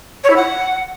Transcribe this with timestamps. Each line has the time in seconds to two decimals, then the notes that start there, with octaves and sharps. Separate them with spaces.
0.24 C#5
0.30 E4
0.36 F#5